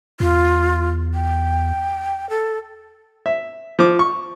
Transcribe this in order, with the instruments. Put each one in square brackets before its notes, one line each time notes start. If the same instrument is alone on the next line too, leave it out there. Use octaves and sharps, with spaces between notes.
[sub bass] E2 [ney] F4
[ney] G5
A4
[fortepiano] E5
F3 D6
C#6